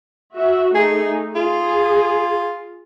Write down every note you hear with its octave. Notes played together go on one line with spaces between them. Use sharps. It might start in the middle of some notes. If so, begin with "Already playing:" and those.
F#4 E5
A3 D#4 G#4
F4 G#4